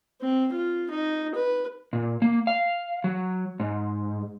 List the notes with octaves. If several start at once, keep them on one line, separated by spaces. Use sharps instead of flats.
C4
F4
D#4
B4
A#2
A#3
F5
F#3
G#2